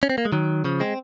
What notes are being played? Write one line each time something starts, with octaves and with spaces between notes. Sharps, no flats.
C#4
C4
A#3
G#3
D#3 F#3
C#3 F3
G#3 C4